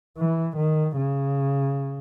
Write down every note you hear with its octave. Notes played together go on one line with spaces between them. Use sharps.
E3
D#3
C#3